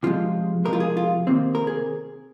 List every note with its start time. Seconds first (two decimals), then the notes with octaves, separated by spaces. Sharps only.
0.03 C3 F3 G#3 F4
0.65 C3 F3 G#3 A#4
0.73 F4
0.80 G#4
0.97 F4
1.27 C3 D#3 A#3 C4
1.55 A#4
1.67 G#4